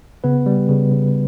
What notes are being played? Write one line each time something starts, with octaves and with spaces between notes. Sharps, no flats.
C#3 B3 B4
G3
C#3
C#3